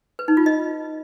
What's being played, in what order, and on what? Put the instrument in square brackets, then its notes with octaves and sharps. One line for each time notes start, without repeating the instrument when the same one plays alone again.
[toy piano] B4
D#4
F4
D#5